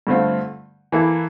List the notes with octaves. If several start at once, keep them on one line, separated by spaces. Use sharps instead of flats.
G2 D3 A3 C4 F4
E3 A#3 E4 A4